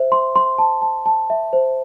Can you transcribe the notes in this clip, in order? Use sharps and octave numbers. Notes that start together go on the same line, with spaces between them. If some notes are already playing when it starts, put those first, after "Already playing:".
Already playing: C5 E5
C6
C6
A5
A5
A5
E5
C5